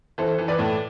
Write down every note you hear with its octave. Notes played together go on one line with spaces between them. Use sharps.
E3 A4 C5
E3
B4 D5
A2